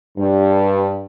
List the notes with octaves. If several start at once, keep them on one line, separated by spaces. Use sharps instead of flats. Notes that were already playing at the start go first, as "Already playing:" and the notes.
G2